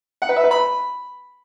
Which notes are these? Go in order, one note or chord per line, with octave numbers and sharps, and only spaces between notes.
F#5
B4
E5
B4
B5